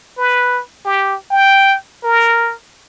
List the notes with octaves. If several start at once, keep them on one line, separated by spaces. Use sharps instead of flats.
B4
G4
G5
A#4